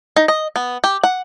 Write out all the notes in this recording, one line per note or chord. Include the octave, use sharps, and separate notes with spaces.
D#4
D#5
B3
G4
F#5